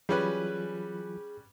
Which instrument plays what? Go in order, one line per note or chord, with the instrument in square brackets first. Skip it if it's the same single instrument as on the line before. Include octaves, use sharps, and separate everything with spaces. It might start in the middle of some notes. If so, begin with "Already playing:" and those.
[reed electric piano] E3 F#3 F4 [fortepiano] G3 C#4 B4 [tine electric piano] G#4